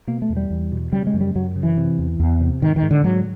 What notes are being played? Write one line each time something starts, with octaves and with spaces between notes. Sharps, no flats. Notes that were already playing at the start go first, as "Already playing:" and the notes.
B2 A#3
A3
E2
G3
E2
B2
C#3 G3
G#3
F#2
G3
F#2 F#3
C#3
E3
C3
E2
E2
C3
G#2 D#3
D#3
G#2
D3
G#2 F#3